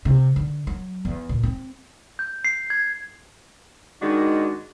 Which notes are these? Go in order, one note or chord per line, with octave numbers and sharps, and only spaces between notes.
C3
D3
F#3
E2
A#2
C4
G6
C7
G#6
D#3 G#3 D4 D#4 F#4